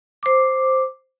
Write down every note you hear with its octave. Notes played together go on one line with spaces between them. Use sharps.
C5 D6